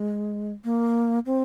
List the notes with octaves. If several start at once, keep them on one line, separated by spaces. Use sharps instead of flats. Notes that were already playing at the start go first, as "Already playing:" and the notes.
Already playing: G#3
A#3
C4